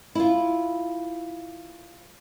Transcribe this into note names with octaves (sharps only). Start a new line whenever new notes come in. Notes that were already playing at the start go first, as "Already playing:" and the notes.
E4 F4